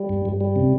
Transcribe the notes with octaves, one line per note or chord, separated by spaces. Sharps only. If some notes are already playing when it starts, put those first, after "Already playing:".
Already playing: G3
G2
G2
G3
C3